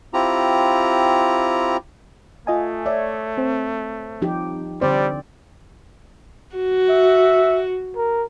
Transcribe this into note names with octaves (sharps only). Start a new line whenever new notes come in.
C4 E4 F4 G4 A#5
A3 F4 D#5 G#5
C#5 D5 E5
C4
F3 D#4 G4
D3 G3 C4 C5 D5
F#4
E5
A#4